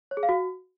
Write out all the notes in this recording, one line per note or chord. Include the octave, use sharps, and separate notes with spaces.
C#5
G#4
F5
F#4